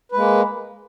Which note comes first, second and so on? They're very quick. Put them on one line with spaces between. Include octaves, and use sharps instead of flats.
B4 G#3 A#3